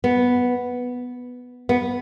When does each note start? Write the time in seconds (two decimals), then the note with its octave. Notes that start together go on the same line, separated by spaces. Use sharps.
0.04 B3
1.69 B3